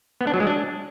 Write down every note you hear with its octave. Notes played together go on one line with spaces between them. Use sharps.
B3
D4
F#3
G#3
D4